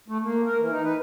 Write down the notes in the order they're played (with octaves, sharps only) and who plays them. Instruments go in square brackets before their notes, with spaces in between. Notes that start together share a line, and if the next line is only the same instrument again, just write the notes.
[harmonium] A3
A#3
A#4
E3
D#4
B4